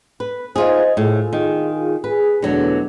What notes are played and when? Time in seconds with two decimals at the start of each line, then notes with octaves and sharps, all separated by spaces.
0.20 B4
0.56 D#4 F4 G#4 C5 D#5
0.97 A2 F4 G#4
1.33 D#3
2.04 G#4 B4
2.42 E2 B2 D3 F#3 A3